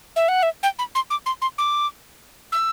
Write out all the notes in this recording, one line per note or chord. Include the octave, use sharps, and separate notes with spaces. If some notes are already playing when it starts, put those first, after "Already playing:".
E5
F#5
E5
G5
B5
C6
D6
C6
C6
D6
E6